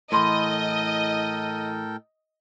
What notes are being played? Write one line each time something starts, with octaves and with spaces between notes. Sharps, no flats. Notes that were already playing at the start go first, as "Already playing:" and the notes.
A2 E3 E4 A4 A#4 D#5 G5 C6